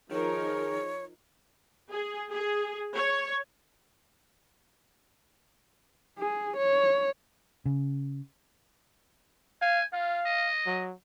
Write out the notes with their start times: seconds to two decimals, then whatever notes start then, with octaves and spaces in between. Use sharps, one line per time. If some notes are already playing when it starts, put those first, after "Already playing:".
0.11 D#3 F3 D#4 G#4 A#4 C#5
1.92 G#4
2.32 G#4
2.95 C#5
6.19 G#4
6.57 C#5
7.66 C#3
9.62 F5 G#5
9.93 F4 F5
10.26 D#5
10.66 F#3